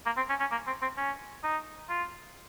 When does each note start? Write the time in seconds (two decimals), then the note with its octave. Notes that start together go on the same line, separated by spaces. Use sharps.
0.06 A#3
0.17 C4
0.29 C#4
0.40 C#4
0.51 A#3
0.67 C4
0.82 C4
0.97 C#4
1.43 D#4
1.89 F4